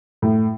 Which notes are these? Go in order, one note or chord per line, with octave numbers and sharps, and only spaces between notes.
A2